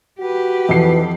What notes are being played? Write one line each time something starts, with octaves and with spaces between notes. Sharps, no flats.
F#4 G4 B4
F2 E3 C7